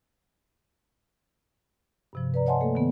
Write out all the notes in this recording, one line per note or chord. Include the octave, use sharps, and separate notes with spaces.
G2 C3 F3
B4 D5 A#5
C#5 D#5 F#5 G#5 A5 C6
A3 A#3 A4
D#3 B3